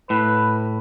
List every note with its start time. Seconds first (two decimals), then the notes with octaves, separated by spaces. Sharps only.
0.10 A2 B4